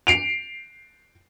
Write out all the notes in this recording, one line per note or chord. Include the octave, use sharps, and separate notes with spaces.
C7 D7 F7